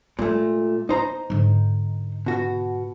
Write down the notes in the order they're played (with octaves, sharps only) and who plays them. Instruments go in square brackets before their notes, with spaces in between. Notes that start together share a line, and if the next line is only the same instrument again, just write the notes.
[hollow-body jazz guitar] A#2 A3 [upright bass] G#3
[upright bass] B3 [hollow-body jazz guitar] D#4 C5 A#5
[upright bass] G#2 D3
[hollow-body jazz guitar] B2 F#4